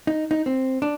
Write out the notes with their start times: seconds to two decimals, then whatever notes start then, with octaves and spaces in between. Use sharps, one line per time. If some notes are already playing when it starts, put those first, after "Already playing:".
0.07 D#4
0.31 D#4
0.46 C4
0.82 D4